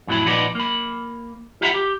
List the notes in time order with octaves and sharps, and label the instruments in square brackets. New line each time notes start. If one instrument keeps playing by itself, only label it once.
[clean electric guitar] F2 A2 F#3 E4 B5
A#2 F3 B3 D#4 B4 D5
A#3 B5
F4 G4 E5 F#5 A#5 B5
G4